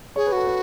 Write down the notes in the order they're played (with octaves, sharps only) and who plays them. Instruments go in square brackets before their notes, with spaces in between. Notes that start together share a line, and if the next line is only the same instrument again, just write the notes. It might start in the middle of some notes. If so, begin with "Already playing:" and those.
[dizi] G#4 [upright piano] C#5
[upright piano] B4
[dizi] F#4 [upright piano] A4
[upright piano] B4